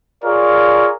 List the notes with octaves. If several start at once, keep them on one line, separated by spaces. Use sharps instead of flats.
F4 G#4 A#4 C#5 D5